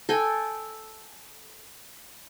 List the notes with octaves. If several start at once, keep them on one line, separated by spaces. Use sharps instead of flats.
A4 G5 G#5